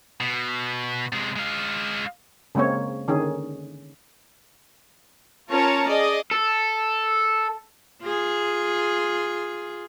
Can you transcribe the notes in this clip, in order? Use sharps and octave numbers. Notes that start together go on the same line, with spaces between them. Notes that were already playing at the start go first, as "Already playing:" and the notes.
B2
C3 G#3
G#3 F5
C#3 G#3 A#3 C4 C#5
D3 D#3 C#4 G#4
C#4 F4 A#4 C#5 A5 A#5
G#4 D5 D#5
A4
F4 G#4